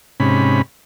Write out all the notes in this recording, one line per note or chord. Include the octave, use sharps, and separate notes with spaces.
G#2 C3 C#4 B5